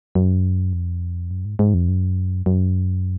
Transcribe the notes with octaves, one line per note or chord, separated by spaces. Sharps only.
F#2
F2
F#2
G#2
G#2
F2
F#2
F#2